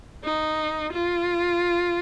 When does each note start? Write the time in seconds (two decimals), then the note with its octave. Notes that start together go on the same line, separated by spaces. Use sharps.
0.24 D#4
0.92 F4